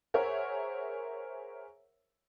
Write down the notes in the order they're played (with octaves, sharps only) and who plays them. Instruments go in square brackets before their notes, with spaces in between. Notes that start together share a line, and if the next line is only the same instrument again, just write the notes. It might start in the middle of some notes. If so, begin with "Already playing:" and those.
[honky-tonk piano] G#4 A#4 C5 C#5 E5 F#5